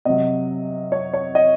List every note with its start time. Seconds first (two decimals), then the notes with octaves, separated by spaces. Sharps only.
0.05 C3 F#3 D#5
0.92 C#5
1.13 C#5
1.35 D#5